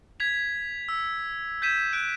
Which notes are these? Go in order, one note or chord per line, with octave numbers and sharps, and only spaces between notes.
G#6 B6 F7
E6
G6 G#6 B6 D#7 E7
F#6 D7